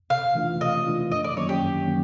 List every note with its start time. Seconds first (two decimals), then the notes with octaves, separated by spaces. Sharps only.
0.10 C3 F5
0.35 E3 A3 D4 F4
0.61 C3 D#5
0.86 E3 A3 D4 F4
1.11 F#2 D#5
1.24 D5
1.37 D#3 F#3 A#3 C#4 C#5
1.49 G4
1.62 F#2
1.87 D#3 F#3 A#3 C#4